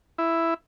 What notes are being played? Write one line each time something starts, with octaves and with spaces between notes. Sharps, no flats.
E4